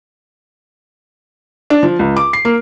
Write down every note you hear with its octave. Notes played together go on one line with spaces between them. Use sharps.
D4
F3
C#2
D6
C7
A#3